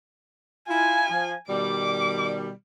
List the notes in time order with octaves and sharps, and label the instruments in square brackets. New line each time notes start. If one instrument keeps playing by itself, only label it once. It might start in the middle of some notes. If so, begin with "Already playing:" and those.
[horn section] E4 F4 [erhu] G#5
[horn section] F3
[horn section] B2 D#3 G3 [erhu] D6